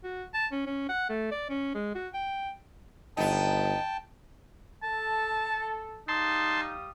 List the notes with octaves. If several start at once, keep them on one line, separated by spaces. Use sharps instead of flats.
F#4
A5
C#4
C#4
F#5
A3
D5
C#4
G#3
F#4
G5
G1 B3 D#4 G5 A5
A4 A5
G3 D#4 F5 A5 C6 D#6